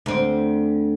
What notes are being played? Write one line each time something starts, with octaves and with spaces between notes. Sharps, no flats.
D2 C4